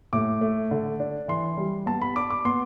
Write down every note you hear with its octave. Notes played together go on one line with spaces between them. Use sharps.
A2 D6
A3
D3
D4
E3 C6
G3
B3 A5
B5
D4 D6
D6
B3 C6